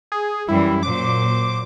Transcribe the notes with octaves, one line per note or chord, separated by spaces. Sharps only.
G#4
F#2 E3 G3 E4
A#2 F#3 C5 D6